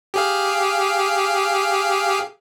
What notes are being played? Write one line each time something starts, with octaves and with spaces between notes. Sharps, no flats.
G4 G#4 F5